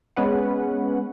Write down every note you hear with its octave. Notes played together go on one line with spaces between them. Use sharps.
G#3 B3 C#4 B4 F#5